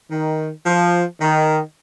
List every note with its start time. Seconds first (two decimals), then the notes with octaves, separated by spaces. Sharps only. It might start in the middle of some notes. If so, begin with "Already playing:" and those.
0.11 D#3
0.66 F3
1.21 D#3